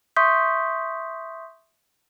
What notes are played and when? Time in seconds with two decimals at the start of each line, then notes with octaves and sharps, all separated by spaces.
0.16 E5 C6 C#6 D#6 G6 B6